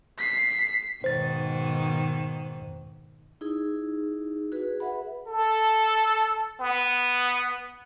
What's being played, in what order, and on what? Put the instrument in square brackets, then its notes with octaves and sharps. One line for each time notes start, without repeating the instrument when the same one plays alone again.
[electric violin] B6 C7
[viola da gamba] G#2 B2 D#3 [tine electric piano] C5 A6
[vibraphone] D#4 E4 G#4
F#4 G#4 B4
G#4 B4 E5 F#5 B5
[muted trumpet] A4
B3